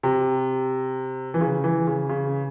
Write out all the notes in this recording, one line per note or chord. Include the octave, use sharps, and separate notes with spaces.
C3
E3
C#3
E3
C#3
C#3